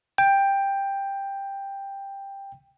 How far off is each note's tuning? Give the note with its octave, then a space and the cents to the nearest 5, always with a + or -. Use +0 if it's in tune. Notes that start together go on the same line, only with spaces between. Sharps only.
G5 +10